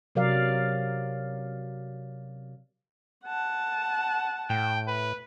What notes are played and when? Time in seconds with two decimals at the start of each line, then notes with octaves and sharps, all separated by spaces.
0.15 C3 F#3 A#4 D5 F5
3.25 F#5 A5
4.50 A2 G5
4.88 B4